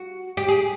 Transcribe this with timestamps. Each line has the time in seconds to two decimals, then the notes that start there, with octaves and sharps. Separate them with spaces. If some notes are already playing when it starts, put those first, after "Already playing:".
Already playing: F#4
0.37 G4
0.48 G#4